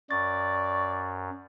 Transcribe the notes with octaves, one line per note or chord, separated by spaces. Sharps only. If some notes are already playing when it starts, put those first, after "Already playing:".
F#2 D5 C#6 A6